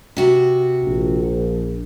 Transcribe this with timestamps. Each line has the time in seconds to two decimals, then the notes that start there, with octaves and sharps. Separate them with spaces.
0.17 C3 F#4
0.83 A#1